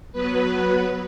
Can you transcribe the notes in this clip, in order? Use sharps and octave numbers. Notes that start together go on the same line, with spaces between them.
F#3 B3 B4